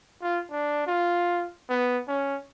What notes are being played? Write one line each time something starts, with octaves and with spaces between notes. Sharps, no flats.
F4
D4
F4
B3
C#4